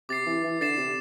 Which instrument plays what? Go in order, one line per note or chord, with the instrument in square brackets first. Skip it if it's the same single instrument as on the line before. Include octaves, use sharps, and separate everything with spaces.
[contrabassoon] C3 [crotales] D6 A6 C7
[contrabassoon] E3
E3
[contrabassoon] D3 [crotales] A6 C7 E7
[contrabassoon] C3